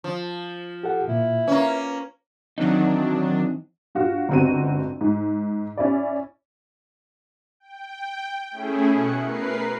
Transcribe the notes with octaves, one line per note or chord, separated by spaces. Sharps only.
F3
G4 A4 F#5
A#2 A#3 E4
A#3 C#4 B4
D#3 E3 F#3 C4 D4 D#4
G2 F4 F#4
G1 C#2 C4 F#4 D#7
G#2
C#4 E4 D5
G5
A3 C#4 E4 G#4
B2 F#6 C#7
A#4 B4 C7